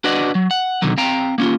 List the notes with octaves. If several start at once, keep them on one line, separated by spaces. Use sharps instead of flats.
D4 F#4 B4 D5 D#5 F#5
F#3
F#5
B2 D3 D#3 F#3
C4 F5 G5 A#5
A#3 C#4 D#4 F4